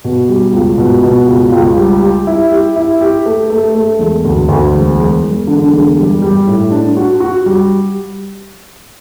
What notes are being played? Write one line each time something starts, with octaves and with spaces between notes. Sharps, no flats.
B2
G3
C#2
B2
B2
C#2
C#2
G3
G4
E4
G4
E4
G4
A3
A3
A3
E1
D2
D2
E1
E1
E1
D3
E1
G3
G3
A2
D4
F#4
F#4
G3